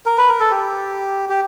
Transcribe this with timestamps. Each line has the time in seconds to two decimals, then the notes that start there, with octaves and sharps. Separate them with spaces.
0.06 A#4
0.18 B4
0.29 A#4
0.40 A4
0.51 G4
1.29 G4